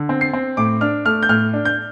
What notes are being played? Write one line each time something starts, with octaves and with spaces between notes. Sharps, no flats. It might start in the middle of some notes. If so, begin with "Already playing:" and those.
Already playing: D3
C4
C7
C4
A2 D6
D4 F6
A3 F6
G6
A2 F6
D4
G6